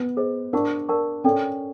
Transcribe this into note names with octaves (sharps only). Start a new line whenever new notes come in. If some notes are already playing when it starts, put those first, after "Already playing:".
Already playing: B3
G#4 C5 D#5
D4 A#4 D5 F#5 A5 C#6
A#4 D5 F#5 A5 C#6
C#4 A4 D5 G5